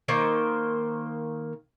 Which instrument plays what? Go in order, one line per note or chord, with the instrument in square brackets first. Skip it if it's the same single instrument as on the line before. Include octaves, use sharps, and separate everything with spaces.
[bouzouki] D#3 A#3 C5